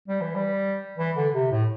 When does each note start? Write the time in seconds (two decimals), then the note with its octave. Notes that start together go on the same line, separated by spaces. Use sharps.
0.08 G3
0.21 E3
0.35 G3
0.98 E3
1.16 D3
1.34 C3
1.51 A2